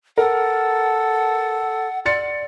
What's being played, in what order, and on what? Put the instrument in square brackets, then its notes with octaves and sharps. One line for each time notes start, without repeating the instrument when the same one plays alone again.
[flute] A4 [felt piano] A#4 [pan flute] F#5
[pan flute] D5 [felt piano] C6 A6 C#7